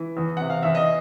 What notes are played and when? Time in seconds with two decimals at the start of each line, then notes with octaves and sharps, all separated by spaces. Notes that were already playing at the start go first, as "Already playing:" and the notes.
Already playing: E3
0.17 E2
0.37 C3 F#5
0.50 F5
0.63 E2 E5
0.75 D#5